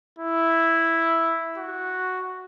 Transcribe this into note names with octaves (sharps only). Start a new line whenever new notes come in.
E4
F#4